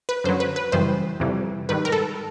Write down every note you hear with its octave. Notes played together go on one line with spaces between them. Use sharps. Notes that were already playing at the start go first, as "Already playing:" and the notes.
B4
F#2 D3 F#3 C5
B4
B4
F#2 C#3 E3 G3 C5
F2 C3 E3 G3
G#2 D#3 G3 B4
A#4
A4